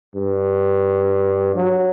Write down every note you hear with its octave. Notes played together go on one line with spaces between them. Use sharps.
G2
F#3